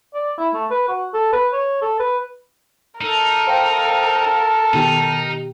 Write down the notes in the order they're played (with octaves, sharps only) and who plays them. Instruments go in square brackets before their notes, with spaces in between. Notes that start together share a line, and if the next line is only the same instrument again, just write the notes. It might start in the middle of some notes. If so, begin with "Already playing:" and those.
[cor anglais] D5
E4
A3
B4
F#4
A4
B4
C#5
A4
B4
[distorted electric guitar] D#4 [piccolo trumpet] A4 [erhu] A#4
[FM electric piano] C5 F5 G5
[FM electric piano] B2 D#3 G4 [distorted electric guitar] D#4